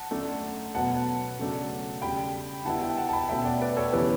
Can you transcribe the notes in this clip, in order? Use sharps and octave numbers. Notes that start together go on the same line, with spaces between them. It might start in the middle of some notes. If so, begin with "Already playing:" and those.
Already playing: F#5 A5
F#2 D3 A3 D4
B2 F#3 B3 F#5 A5
C#3 F#3 A3 D4
C#3 G3 D4 G5 B5
D3 G3 B3 E4 F#5 A5
E5 G5
F#5 A5
A5
G5 B5
B2 A3 C#4 E5 G5
D5 F#5
B4 D5
A4 C#5
C#3 E3 B3 E4 G4 B4